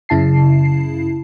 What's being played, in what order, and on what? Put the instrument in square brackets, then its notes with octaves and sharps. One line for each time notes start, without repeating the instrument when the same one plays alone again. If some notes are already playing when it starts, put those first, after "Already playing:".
[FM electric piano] F#2 C#3 E4 A5 C7